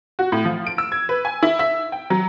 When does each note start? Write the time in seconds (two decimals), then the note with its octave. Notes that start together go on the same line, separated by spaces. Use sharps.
0.19 F#4
0.32 A2
0.45 F3
0.67 D7
0.78 E6
0.92 G#6
1.09 B4
1.25 G#5
1.43 E4
1.59 E5
1.92 G5
2.10 F#3